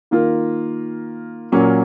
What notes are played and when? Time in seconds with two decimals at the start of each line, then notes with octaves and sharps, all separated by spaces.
0.11 D#3 A#3 F4 A#4
1.52 A#2 F#3 A#3 C#4